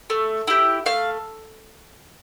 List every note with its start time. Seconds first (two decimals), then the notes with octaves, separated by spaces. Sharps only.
0.10 A3
0.47 E4 G4
0.86 A3 F5